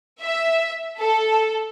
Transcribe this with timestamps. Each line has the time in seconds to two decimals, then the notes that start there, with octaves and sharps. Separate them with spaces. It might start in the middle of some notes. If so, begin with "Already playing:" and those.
0.20 E5
0.99 A4